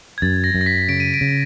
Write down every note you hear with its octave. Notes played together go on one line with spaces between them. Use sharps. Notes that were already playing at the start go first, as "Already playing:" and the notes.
G#6
F#2 A6
A#6
F#2
A#6
B6
C#3 D7
D#7
D7
C#3